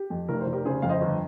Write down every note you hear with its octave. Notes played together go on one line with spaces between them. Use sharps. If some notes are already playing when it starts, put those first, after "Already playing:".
Already playing: G4
F2
F1 A#4
C5
F1
G4 A#4
C#3 G#4 C5
F2 F5
C5 D#5
G1